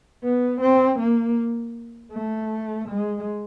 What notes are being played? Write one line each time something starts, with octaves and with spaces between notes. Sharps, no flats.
B3
C4
A#3
A3
G#3